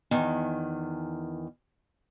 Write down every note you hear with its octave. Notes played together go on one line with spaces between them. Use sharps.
E2 D#3